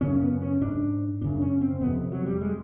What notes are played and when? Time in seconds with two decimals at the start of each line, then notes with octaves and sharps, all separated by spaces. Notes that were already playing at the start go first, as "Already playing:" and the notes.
0.01 F#2 C#3 C#4
0.21 B3
0.42 C#4
0.62 G#2 D4
1.21 F#2 C#3 D4
1.42 C#4
1.61 C4
1.81 F2 C3 B3
2.12 F#3
2.26 G3
2.41 G#3